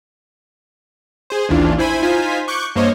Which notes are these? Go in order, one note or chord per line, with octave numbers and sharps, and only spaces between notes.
G#4 C5
A1 D#2 E3 D4 F4
E4 C5 G#5 B5
D#4 F4 C5 G#5 B6
C#6 D6 F#6 G6
G2 A#3 C5 C#5 D#5